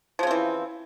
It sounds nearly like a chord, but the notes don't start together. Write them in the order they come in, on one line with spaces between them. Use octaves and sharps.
F3 C#3 C4 E3